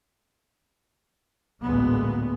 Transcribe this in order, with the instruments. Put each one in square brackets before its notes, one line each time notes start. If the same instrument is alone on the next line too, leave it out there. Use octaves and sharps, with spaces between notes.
[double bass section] A1 D2 A#2 G#3 B3